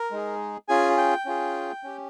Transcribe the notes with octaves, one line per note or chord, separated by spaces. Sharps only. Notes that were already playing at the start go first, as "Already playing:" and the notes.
Already playing: A#4
G#3 D#4 G#4
C#4 F4 G#4 G#5
G5
C#4 F4 G#4
C#4 G4